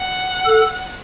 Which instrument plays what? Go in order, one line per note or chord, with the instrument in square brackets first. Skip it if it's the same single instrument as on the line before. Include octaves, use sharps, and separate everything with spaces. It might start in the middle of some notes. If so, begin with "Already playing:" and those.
Already playing: [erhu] F#5
[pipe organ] A4